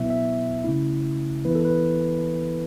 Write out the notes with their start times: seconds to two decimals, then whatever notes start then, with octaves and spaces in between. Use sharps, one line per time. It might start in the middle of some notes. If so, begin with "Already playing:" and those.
Already playing: B2 F#3 B3 E4 E5
0.10 E5
0.64 C#3 A3 C#4 E4
1.45 E3 B3 E4 B4
1.55 A4
1.65 B4